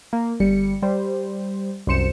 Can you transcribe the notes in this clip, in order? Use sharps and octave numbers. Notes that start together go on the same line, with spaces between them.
A#3
G1 G3 C#7
G3 C5
C2 F#2 C5 C#7 E7